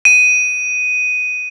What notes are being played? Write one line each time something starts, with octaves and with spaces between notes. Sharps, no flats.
D#7